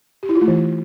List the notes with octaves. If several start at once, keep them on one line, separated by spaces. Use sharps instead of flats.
G4
E4
F4
A3
E3